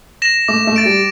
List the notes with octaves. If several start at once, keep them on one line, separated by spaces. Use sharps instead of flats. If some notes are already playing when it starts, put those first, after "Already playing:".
A#6 E7
A3 D6
A3
A6 D7
G3